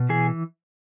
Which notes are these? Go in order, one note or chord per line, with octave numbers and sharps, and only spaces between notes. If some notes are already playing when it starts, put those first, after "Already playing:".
Already playing: B2
E3 G#4